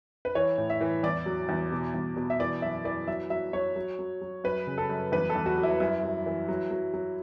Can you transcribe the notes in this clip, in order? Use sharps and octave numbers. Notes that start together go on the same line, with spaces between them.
B4
E3 C#5
A2
E5
E3
E2 D5
F#3
E2
B2
E2
B2
E5
E3 D5
F#2 E5
E3 D5
F#3 E5
F#3 E5
F#3 C#5
F#3
F#3
F#3
F#2 B4
C#3
A4
F#2
E2 B4
A4
E2
F#4
F#3
E4
F#2 E4
F#2
E3
F#3
F#3
F#3